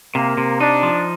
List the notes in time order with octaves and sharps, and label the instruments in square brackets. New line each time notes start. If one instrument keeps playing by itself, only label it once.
[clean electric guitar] C3 [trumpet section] A#3
[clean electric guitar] C3
[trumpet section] D4 [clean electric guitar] D#4
[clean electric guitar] F3